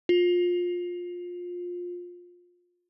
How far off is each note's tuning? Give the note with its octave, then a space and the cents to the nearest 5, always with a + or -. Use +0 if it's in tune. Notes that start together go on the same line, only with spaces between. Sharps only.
F4 +20